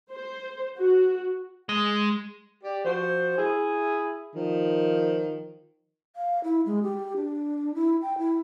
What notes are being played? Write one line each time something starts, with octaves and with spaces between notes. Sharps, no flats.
C5
F#4
G#3
G4 D5
F3 F#4 C5
E4 G#4
D#3 F3
F5
E4
G#3
G4
D4
E4
G5
E4